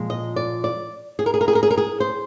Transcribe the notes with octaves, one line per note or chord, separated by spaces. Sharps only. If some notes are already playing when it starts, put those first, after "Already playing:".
Already playing: A#2 F3 G#3
D#5
D5
D5
G#4
A#4
G#4
A#4
G#4
A#4
G#4
A#4
G#4
C5